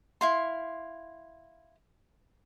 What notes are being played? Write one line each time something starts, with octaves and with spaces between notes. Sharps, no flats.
E4 F5 C6